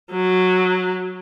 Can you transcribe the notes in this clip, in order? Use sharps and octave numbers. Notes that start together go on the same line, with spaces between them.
F#3